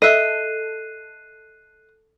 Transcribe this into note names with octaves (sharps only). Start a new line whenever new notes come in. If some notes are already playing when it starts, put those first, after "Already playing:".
A4 D#5 E5 F#6 C7 D#7